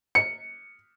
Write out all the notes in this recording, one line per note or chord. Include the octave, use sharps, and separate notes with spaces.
C#7